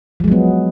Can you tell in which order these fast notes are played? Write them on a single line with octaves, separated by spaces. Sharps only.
F3 G#3 F#3 B3